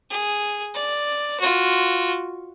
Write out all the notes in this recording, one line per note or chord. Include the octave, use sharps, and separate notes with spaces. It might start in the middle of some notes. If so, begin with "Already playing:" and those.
G#4
D5
F4 F#4